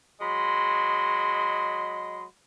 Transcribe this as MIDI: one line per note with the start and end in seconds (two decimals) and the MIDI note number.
0.21 2.25 54
0.21 2.25 56
0.21 2.25 75
0.21 2.25 83
0.21 2.25 84